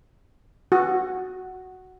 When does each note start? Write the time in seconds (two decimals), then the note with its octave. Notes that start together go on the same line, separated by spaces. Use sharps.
0.72 F#4